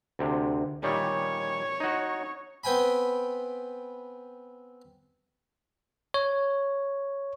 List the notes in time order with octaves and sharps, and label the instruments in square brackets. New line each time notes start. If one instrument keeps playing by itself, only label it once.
[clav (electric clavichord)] D2 C3
[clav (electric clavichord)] A#2 D#3 G3 [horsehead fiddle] C#5
[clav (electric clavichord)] D#4 F#4
[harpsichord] B3 C4 G5 G#5 B5
[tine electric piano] C#5